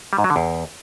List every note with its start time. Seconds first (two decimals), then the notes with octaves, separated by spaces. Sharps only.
0.13 G3
0.18 G#2
0.24 F#3
0.30 D3
0.36 E2